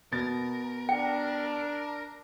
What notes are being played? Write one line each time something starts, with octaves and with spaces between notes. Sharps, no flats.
B2 A#4 A6
D4 G5